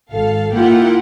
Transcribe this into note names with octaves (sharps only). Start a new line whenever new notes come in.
G#1 A4 F5
A#3 E4 F4 G4 F#5 G5